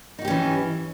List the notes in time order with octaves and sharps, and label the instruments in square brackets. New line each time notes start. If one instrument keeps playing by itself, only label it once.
[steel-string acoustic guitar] D#4
F#4
G4
C#4
E3